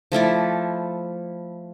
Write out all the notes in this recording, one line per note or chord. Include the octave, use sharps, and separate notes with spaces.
F3 A3 E4 D5